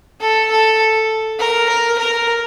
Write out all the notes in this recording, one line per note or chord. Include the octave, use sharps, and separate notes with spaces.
A4
A4
A#4
A#4
A#4